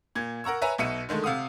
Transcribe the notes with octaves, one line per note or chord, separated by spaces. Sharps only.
A#2 G#6
A#4 F#5 A#5 C#6 E6
B4 C#5 E5 G#5 A#5
B1 B2 E5 C#7 D#7
D3 D#3 G#3 A3
C3 F5 F#5 D#6